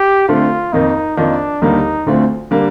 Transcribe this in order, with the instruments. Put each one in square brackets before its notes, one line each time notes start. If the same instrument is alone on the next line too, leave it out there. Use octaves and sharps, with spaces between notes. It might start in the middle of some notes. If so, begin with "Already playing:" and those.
Already playing: [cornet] G4
[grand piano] D3 A3 C4 [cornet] F4
[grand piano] F2 D#3 A#3 [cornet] D#4
[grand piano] F2 D#3 A#3 F4 [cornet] D4
[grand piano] D#2 D3 G3 A#3 [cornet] D#4
[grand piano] D2 D3 A3 C4 F4
D3 G3 A#3